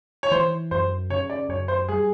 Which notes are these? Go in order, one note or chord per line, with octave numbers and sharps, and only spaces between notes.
C#5
E3 C5
F#2 C5
C#3 C#5
D5
F#2 C#5
C5
G3 G#4